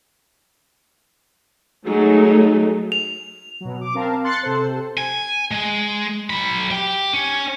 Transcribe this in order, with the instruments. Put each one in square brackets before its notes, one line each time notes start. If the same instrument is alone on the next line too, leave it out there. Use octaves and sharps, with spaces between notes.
[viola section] F#3 G#3 A3 D#4
[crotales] F7
[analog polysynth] B2 F#3
D6
C4 A#4 F5 A5
C6 F#6 A6 C7 C#7
C3 A4 C5
[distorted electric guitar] G#5
G#3
F#3 B5
G4 G5
C#4